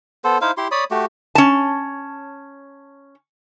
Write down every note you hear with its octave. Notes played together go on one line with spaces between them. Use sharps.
B3 A4 C5
D#4 E4 C5 F5
E4 G4 C6
C#5 D5 B5 D#6
A3 F#4 G4
C#4 A5